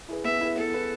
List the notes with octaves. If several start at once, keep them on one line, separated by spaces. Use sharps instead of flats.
E4 G#4 B4
B3 E5
E4 G#4 B4
B3 A4
E4 G#4 B4